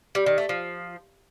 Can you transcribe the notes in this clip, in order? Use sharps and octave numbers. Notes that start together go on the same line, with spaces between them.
G3
D#3
A3
F3